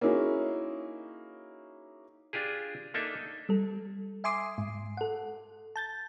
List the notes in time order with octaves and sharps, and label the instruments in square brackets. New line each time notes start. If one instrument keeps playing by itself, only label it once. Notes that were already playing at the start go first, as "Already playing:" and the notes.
[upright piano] A#3 C#4 D#4 E4 F#4 G#4
[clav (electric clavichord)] D4 F4 G4 G#4
A#3 D4 D#4 A4 E5
[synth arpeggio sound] G3 A4
E5 G#5 C6 D6 D#6 C7
G#2
A4 F#5
A5 G6 A6